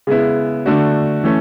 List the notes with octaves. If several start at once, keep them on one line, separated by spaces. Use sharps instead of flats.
C#3 G#3 B3 E4
D3 A3 D4 F#4
E3 A3 C#4